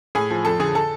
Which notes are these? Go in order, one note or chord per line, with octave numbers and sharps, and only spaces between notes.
A2 G#4 G#5
F3
F2 A4 A5
D3 G#4 G#5
A4 A5